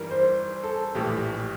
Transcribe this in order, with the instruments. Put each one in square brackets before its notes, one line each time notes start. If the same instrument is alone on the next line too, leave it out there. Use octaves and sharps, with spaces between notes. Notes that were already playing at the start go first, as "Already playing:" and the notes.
Already playing: [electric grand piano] G2 E3 G3 [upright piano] A#4
[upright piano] C5
A4
[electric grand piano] A#1 A2 E3 [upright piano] G4